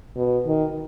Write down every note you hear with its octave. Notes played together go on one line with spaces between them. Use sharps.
B2
D#3